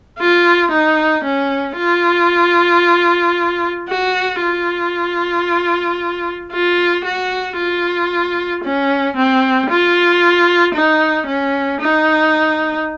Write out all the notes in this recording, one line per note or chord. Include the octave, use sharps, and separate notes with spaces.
F4
D#4
C#4
F4
F#4
F4
F4
F#4
F4
C#4
C4
F4
D#4
C#4
D#4